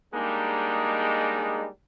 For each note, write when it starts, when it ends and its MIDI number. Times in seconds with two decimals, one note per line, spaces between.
0.14 1.67 55
0.14 1.67 56
0.14 1.67 58
0.14 1.67 62
0.14 1.67 63
0.14 1.67 68